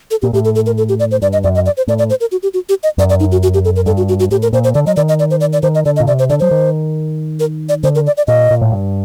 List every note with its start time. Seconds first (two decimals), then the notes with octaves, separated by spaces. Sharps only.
0.11 A4
0.22 A#2 G4
0.33 A2 G4
0.45 A4
0.55 A4
0.66 A#4
0.78 A4
0.89 G4
1.00 D5
1.11 C5
1.22 G2 D5
1.33 D#5
1.44 F#2 D5
1.55 D#5
1.66 D5
1.77 C5
1.87 A2 D5
1.98 D5
2.10 C5
2.21 A#4
2.32 F#4
2.43 G4
2.54 F#4
2.69 G4
2.83 D#5
2.98 F#2 D5
3.09 D5
3.20 D#4
3.32 F#4
3.43 F#4
3.54 G4
3.65 A4
3.76 A#4
3.86 G2 A4
3.97 F#4
4.09 F#4
4.20 F#4
4.31 A2 G4
4.42 A#4
4.53 A#2 C5
4.64 C5
4.74 D3 D5
4.87 F#3 D#5
4.96 D#3 D5
5.09 D#5
5.19 D5
5.31 C5
5.41 D5
5.53 D5
5.63 D#3 C5
5.75 D#5
5.85 D3 D5
5.96 D#5
6.00 A#2
6.07 C3 D5
6.19 C5
6.30 D3 D5
6.40 F#3 C5
6.51 D#3
7.40 A#4
7.69 D5
7.83 D3 C5
7.95 A#4
8.07 D5
8.17 D5
8.27 A#2 D#5
8.51 A#2
8.61 A2
8.72 G2